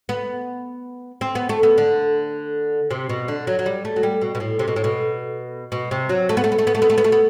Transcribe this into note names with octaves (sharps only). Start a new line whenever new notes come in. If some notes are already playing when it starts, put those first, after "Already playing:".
B3
C4
B3
A3
B3
D3
C3
B2
D3
F#3
F#3
G3
A3
F#3
G3
B2
B2
A2
C3
B2
A2
B2
B2
C3
F#3
A3
B3
A3
B3
A3
B3
A3
B3
A3
B3
A3
B3